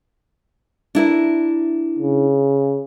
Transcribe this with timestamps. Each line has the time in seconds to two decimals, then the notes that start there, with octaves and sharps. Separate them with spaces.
0.95 D4 E4 A#4
1.99 C#3